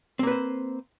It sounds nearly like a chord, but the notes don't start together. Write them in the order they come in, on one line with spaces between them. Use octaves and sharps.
C4 A#3 B4 C5